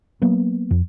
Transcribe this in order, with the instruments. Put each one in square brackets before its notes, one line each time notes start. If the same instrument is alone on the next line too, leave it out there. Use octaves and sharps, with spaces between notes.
[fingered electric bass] F#3 A#3 B3
F2